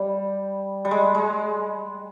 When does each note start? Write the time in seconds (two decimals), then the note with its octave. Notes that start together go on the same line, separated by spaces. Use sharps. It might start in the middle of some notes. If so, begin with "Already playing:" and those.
Already playing: G3
0.85 G3
0.91 G#3
1.14 G#3